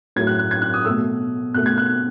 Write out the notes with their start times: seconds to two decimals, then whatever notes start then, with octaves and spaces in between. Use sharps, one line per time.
0.16 A2 F#3 A3 G#6
0.27 F#6
0.39 F#6
0.51 G#6
0.62 F#6
0.74 D#6
0.85 B2 A3 E6
1.54 B2 A3 F#6
1.66 G#6
1.78 F#6